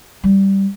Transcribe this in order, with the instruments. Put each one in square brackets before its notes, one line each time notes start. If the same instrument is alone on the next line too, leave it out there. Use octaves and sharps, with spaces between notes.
[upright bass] G3